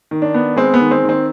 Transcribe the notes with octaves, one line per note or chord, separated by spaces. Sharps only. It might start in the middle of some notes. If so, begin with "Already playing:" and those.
D#3
D4
B3
G#3 C4
B3
D#3
C4
D#3
C4